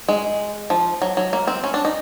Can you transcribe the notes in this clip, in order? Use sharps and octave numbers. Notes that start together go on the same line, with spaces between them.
G#3
F3
F#3
F#3
A#3
C4
C#4
D4
D#4